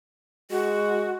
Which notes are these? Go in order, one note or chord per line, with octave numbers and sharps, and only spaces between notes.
G#3 F#4